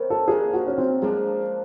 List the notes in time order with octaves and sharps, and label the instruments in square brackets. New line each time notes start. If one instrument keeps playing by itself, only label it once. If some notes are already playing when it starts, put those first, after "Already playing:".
Already playing: [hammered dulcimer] C3 D#3 F#3 B3
[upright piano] A4
[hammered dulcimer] C#3 F3 A#3 D4 [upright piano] G#4
[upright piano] F#4
C#4
C4
[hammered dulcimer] C#3 F3 A#3 D4 [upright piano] G#3